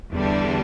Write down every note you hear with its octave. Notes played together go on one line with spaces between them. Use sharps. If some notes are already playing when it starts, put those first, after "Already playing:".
E2 D3 G3 D4